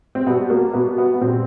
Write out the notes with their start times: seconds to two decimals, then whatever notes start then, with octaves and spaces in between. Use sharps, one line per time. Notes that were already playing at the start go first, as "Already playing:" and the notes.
0.15 C4
0.26 B2 G3 B3
0.50 A#3
0.73 B2 G3 B3
0.98 B3
1.14 B3
1.21 A#2 G3 C4